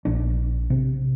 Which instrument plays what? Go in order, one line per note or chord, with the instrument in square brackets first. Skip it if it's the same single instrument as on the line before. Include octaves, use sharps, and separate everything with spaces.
[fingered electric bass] A#1 D4
C3